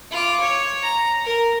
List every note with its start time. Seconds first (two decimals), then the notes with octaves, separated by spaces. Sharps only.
0.11 F4 D6
0.41 C#5
0.83 A#5
1.25 A#4